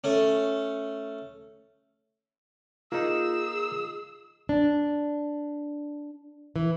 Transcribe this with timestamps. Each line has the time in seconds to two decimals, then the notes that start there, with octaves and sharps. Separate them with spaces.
0.04 A3 C#4
2.92 A#3 D#4 F4 G#4 E6
4.49 D4
6.56 E3